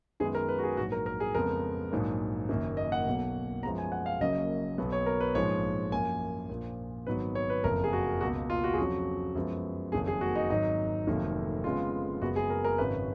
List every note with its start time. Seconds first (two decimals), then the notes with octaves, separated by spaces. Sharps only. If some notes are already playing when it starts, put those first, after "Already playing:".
0.20 F#2 D#3 G#3 B3 G#4
0.35 A#4
0.49 B4
0.58 F#4
0.63 G#4
0.77 A#1 F#4
0.80 G#2 F#3
0.92 A#4
1.06 A#4
1.20 G#4
1.34 F2 C#3 G#3 B3 A#4
1.92 A#1 G#2 F#3 A#3
2.49 F#1 F#2 D#3 A#3
2.77 D#5
2.92 F#5
3.06 B1 B2 F#3 A#3
3.63 F#2 F3 G#3 B3 A#5
3.78 G#5
3.92 F#5
4.06 F5
4.20 F#1 F#2 C#3 F#3 A#3 D#5
4.78 B1 B2 F#3 B3
4.92 C#5
5.06 A#4
5.20 B4
5.35 A#1 G#2 F3 G#3 C#5
5.92 F#2 F3 A#3 G#5
6.49 A#1 A#2 F3 A#3
7.07 G#1 G#2 F#3 B3 B4
7.35 C#5
7.50 B4
7.64 F#1 F2 F3 A#4
7.84 G#4
7.93 F#4
8.21 C#2 B2 A#3 F#4
8.50 F4
8.64 F#4
8.73 G#4
8.78 F2 C#3 F#3 F#4
9.35 F#2 F3 G#3 B3
9.92 F#1 F2 D#3 F#3 A#3 G#4
10.07 G#4
10.21 F#4
10.35 D#4
10.50 G#1 G#2 F#3 D#4
11.07 F1 F2 D#3 F#3 A#3
11.64 F2 C#3 G#3 B3 F4
12.21 F#1 F#2 C#3 G#3 B3 F#4
12.36 G#4
12.50 A#4
12.64 A#4
12.78 G#1 F#2 C#3 B4